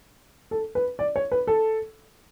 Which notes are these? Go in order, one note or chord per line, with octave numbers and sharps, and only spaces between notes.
A4
B4
D5
C#5
B4
A4